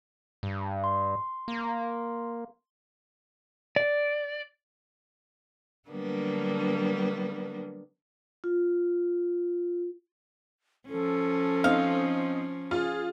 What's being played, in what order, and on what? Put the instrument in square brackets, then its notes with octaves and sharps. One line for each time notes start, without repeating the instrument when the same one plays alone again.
[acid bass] G2
[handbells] C6
[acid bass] A#3
[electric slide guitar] D5
[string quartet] D3 F#3 G3 A#3 B3 D4
[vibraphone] F4
[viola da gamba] F3 C#4 [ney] A4
[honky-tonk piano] C4 D#4 [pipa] F5
[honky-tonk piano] F4 [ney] G#4